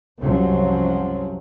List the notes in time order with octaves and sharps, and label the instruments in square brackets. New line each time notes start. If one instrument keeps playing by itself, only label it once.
[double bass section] C2 F#2 F3 F#3